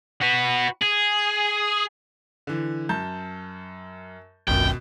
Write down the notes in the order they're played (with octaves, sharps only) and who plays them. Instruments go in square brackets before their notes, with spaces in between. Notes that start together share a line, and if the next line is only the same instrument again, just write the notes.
[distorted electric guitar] F#4 B4
G#4
[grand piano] D3 E3
F#2 A5 G6
[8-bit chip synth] G#1 C#2 F#2 [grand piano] B2 [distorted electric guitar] G5